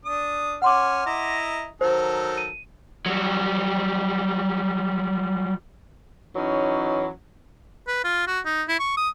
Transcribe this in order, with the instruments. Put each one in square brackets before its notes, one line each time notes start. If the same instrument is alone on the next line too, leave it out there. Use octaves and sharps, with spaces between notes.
[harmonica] D4 D#6
[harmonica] C#4 F6 [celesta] F#5 C6 D6
[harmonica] E4 D#5 A#5
[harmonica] D#3 F#3 A4 [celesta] C5
[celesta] D#7
[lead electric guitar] F#3 G3
[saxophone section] E3 F#3 C#4 D#4
[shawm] B4
F4
F#4
D#4
E4
C#6
D#6